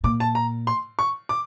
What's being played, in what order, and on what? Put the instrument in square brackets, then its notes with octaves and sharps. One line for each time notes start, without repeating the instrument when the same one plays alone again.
[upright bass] A#2 [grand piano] D6
[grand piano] A5
A#5
C6
C#6
D6